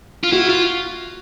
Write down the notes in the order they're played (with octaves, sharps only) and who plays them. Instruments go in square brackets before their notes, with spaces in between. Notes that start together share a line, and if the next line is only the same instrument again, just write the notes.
[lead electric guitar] F4
[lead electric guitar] E4 [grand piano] F#4
[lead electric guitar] F4